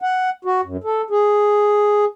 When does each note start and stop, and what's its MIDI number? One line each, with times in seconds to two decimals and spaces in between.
0.02 0.30 78
0.45 0.61 66
0.64 0.77 42
0.84 1.02 69
1.10 2.05 68